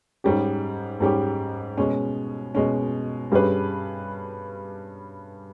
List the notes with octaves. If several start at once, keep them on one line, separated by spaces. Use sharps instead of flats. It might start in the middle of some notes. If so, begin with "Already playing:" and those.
G#2 G3 C#4 G4
G#2 G3 C#4 G4
B2 G#3 C#4
B2 G#3 C#4
G2 G3 C#4 G#4 B4